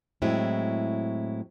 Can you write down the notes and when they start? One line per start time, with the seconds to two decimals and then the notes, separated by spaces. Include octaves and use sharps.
0.22 A2 F#3 G#3 C4 E4